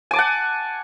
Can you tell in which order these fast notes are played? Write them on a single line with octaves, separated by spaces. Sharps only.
G#5 D6 A5 F#5